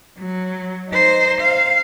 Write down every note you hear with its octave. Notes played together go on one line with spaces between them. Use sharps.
F#3
D#4 C5
F5